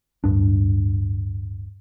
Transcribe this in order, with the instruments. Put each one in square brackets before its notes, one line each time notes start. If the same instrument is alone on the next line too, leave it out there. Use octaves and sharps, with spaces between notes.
[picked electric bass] D1 G2 D4